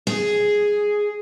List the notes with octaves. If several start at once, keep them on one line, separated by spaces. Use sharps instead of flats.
G#4